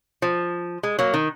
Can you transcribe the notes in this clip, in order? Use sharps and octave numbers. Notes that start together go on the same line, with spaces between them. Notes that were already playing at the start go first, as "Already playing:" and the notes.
F3
G#3
F#3 A#3
D#3